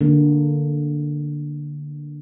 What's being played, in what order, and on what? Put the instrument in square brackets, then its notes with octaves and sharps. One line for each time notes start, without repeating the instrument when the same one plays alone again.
[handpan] D3 A#3